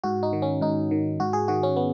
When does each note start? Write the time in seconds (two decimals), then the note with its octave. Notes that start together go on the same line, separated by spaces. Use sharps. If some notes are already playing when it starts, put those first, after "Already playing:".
0.04 G#2 F#4
0.23 D#4
0.33 D#3
0.42 C#4
0.61 G#2 D#4
0.91 D#3
1.20 G#2 F#4
1.33 G#4
1.48 D#3 F#4
1.63 C#4
1.76 B3